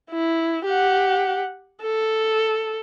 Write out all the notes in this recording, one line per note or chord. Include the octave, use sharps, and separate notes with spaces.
E4
G4 F#5
A4